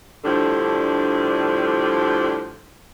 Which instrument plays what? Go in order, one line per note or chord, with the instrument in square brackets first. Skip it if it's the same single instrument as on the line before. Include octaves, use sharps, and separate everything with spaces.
[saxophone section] A2 D3 F3 G3 D4